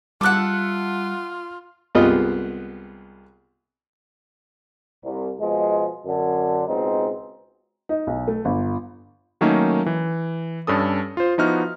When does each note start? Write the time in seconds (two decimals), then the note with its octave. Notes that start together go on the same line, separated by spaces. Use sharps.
0.21 G3 F4 A4 E5 F#5 D6 F#6
1.95 C2 G#3 B3 F4 G4 D#5
5.04 C2
5.40 B2 F3 G#3
6.06 F#2 D3
6.68 C#2 B2 G#3 C4 D#4
7.89 D#4
8.07 B1
8.28 A3
8.45 G1
9.41 D#3 F#3 A3 A#3 C#4 D#4
9.86 E3
10.67 G2 C#4 A4 D#6
11.17 F4 C5
11.38 F3 B3 D#4 E4 F#4 F6